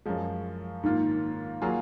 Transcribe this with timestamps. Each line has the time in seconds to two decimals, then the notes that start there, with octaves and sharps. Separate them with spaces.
0.06 F#2 F3 G#3
0.83 G#2 D#3 A#3 F4
1.62 F#3 A#3 F4 G#4